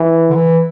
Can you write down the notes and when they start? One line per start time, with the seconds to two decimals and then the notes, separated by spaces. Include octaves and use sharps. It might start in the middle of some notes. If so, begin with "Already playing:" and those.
Already playing: E3
0.30 D3
0.36 E3